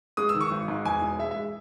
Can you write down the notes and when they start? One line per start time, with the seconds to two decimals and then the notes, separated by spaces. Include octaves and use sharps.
0.17 G#3 D#6
0.29 E6
0.34 D#3
0.41 C#6
0.51 G#1
0.68 G#2
0.85 E2 G#5
1.02 E1
1.19 G#3 E5
1.31 E5
1.36 G#3